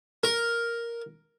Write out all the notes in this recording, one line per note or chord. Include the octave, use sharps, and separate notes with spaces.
A#4